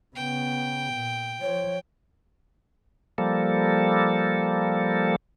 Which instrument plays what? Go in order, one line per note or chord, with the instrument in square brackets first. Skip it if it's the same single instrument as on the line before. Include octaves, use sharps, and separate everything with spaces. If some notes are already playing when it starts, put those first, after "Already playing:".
[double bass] C#3 B3 [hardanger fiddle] G5
[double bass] A#2
[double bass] F3 [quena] C#5
[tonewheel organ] F3 G3 A#3 A4